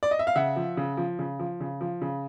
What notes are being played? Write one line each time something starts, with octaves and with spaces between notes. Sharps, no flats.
D5
D#5
E5
F5
C#3 E5 F#5
F3
C#3
F3
C#3
F3
C#3
F3
C#3